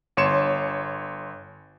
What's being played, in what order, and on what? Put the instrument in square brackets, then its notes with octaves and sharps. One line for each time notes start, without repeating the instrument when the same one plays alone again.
[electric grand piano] G1 C#5 C6 C#7 E7